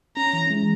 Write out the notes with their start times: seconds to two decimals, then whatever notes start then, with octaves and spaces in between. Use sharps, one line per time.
0.17 C#4 A#5
0.33 E3
0.50 G#3